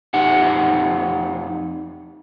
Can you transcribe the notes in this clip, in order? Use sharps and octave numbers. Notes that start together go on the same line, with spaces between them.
F2 D#4 G4 F#5